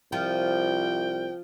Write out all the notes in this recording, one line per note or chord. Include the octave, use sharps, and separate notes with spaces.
C2 F3 G5